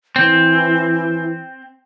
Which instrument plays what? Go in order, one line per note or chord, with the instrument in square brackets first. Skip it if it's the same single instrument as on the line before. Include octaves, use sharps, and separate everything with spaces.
[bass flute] E3 [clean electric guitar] C4